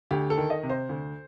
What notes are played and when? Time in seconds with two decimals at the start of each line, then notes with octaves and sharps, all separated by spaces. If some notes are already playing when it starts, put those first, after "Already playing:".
0.11 D2 G4
0.30 A4
0.37 D#3
0.50 D#5
0.63 C3
0.70 C5
0.89 D2